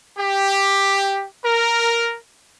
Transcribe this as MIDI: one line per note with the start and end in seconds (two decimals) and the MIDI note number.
0.18 1.25 67
1.45 2.16 70